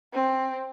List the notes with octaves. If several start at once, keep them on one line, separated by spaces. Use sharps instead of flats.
C4